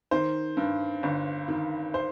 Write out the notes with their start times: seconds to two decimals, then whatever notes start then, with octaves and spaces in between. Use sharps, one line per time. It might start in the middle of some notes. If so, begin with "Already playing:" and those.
0.11 D#3 C5
0.57 G2
1.03 G1
1.48 D#3
1.94 C5